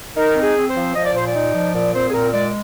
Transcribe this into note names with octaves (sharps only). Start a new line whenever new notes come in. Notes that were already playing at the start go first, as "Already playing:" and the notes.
D#4 A#4
C4
G#4
C4
C5
F3
F3 D#5
D5
A#2 C5
D5
D#4
F3
A#2 D5
C4 C5
G#4
A#2 A#4
G#3 D5